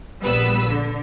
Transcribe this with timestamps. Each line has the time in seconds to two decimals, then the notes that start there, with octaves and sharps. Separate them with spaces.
0.23 A#1 G3 B3 B4 E6
0.68 D3